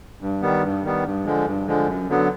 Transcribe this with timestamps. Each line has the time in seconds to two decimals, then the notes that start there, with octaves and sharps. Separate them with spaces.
0.21 G2
0.42 D#3 G3 B3
0.63 G2
0.84 D#3 G3 B3
1.04 G2
1.25 D3 F3 G#3
1.46 G2
1.67 D3 F3 G#3
1.87 F#2
2.08 D3 F#3 B3